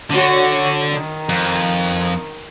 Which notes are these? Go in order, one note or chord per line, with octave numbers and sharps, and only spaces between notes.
D3 F#4 C#5
D#3
F2